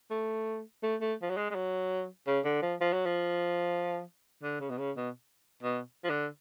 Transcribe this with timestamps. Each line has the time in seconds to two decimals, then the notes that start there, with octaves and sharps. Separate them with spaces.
0.11 A3
0.83 A3
1.01 A3
1.22 F3
1.30 F#3
1.37 G#3
1.50 G#3
1.55 F#3
2.27 C#3
2.45 D3
2.62 F3
2.81 F3
2.93 F#3
3.06 F3
4.43 D3
4.60 C#3
4.70 B2
4.78 C#3
4.97 B2
5.63 B2
6.04 F3
6.10 D3